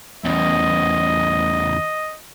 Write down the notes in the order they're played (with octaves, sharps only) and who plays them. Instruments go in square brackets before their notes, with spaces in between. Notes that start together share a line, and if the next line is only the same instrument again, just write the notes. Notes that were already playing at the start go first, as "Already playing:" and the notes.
[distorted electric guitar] E2 C#3 [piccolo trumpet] D#5